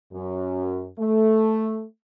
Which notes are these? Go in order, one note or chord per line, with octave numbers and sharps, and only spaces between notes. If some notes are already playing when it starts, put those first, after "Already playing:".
F#2
A3